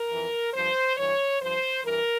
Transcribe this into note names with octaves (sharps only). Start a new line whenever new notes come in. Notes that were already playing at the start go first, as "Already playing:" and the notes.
Already playing: A#4
F2 E3
G2 F3 C5
G2 E3 C#5
G2 F3 C5
G2 E3 A#4